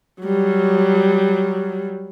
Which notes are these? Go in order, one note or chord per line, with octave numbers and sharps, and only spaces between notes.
F#3 G3